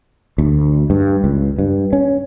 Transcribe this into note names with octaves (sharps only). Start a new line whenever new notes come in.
D2
G2
C#2
G2
C#4